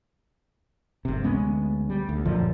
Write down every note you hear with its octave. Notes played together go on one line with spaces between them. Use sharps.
G1 C3
D2 G#3 B3 C#4
G3
D2
A#1 F#2 D3 F3